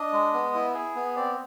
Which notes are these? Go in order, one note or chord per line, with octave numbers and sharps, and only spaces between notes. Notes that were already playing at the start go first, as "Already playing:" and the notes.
Already playing: D4 D#5
G#3
B3
E4
G#4
B3
C4 D5